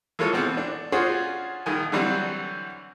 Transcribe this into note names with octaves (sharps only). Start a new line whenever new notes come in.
E3 G#3 A#3 F4 A4 C#5
B2 E3 B3 C4
D4
C#4 D4 F4 F#4 G#4 C5
A#1 D#3 G#5
D3 E3 F#3 G3 C4